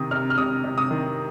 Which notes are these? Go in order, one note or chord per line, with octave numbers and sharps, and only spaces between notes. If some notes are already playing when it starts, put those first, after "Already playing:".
Already playing: C3 D#3 D#6
C3 F6
F6
C3 D#6
C3
D#6
D#3